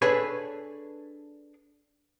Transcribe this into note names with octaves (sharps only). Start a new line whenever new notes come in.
D4 G#4 A4 B4 C#5